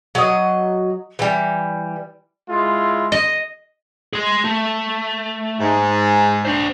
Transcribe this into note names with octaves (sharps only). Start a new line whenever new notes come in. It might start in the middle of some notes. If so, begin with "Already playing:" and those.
F#3 D#5
E3 G3
G#3 E4 F4
D#5
G#4 C6
A3
G#2
D4 C5